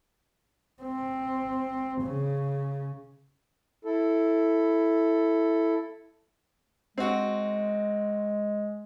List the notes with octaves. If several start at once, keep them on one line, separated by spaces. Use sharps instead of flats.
C4
C#3
E4 A4
G#3 C4 F#4